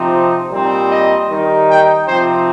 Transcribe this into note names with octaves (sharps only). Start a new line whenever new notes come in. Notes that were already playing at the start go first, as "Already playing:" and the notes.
Already playing: C3 F3 C4 D#4
A#2 G3 C4 D#4
D#5
D#3 G3 D#4
G5
C3 F3 C4 D#4 C5